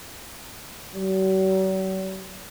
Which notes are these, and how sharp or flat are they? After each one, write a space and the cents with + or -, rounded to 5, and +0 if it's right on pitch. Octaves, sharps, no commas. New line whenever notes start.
F#3 +45